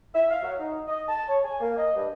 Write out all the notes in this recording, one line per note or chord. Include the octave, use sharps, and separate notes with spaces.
E5
F5
F#3
D#4
D#5
A5
C#5
G#5
A#3
D#5
G2